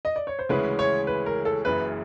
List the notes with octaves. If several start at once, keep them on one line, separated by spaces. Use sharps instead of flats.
D#5
D5
C#5
C5
D2 C#3 E3 G#3 C#4 B4
C#5
B4
A#4
A4
F#1 F#2 C#3 E3 B4